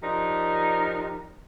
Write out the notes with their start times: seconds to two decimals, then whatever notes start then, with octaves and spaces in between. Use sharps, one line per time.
0.02 F3 D4 D#4 G4 A#4